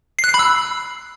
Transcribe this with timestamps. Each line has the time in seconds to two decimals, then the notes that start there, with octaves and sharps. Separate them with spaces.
0.19 C7
0.24 F#6
0.29 C7
0.34 B5
0.39 E6